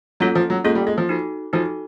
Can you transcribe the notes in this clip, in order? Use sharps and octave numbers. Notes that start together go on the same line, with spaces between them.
F#3 A#3 C#4 F4 A4
F3
F#3
G#3 A#3 C#4 F4 A4
G3
G#3
F3
D#4 F#4 A4
F3 D#4 F#4 A4